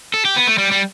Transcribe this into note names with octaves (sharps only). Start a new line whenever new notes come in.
A4
G4
B3
A3
G3
G3